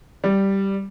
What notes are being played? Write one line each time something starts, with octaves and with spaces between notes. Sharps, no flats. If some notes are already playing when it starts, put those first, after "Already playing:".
G3